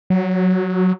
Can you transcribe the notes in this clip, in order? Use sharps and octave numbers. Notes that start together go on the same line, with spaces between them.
F#3